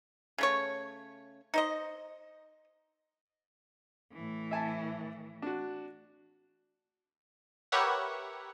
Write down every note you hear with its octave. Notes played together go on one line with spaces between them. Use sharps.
C#3 A3 C#5
D#4 C5 D#5
A2 E3
E5 G#5 A5
D4 F#4
G4 A#4 B4 C#5 E5 F#5